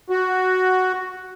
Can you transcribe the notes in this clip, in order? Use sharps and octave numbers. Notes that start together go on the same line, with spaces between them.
F#4